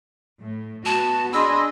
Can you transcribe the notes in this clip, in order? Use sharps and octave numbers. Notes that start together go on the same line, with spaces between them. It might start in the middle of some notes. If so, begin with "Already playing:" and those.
A2
B3 F#4 A5
D4 G#4 D#5 B5 C6 E6